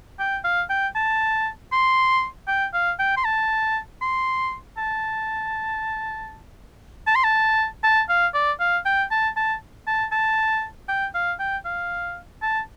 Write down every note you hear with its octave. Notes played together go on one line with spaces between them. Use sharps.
G5
F5
G5
A5
C6
G5
F5
G5
C6
A5
C6
A5
A5
C6
A5
A5
F5
D5
F5
G5
A5
A5
A5
A5
G5
F5
G5
F5
A5